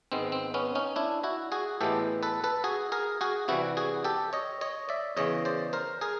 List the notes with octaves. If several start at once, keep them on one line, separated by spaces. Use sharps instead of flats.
G#2 D#3 G#3 B3 C4
C4
B3 C#4
C#4 D#4
D4 E4
E4 F#4
F#4 G#4
A2 E3 G#3 B3 G4 A4
A4 B4
A4 B4
F#4 G#4
G#4 A#4
F#4 G#4
C3 E3 G3 E4 F#4
F#4 G#4
G4 A4
C#5 D#5
C#5 D#5
D5 E5
E2 C#3 E3 C#5 D#5
C5 D5
A#4 C5
G#4 A#4